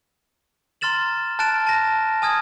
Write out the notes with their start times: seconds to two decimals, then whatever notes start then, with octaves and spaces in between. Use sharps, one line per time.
0.81 A#5 C6 F6 A6 E7 F#7
1.39 A5 F6 F#6 A6 D7 E7
1.67 A5 A#6
2.22 G#5 D#6 F6 G#6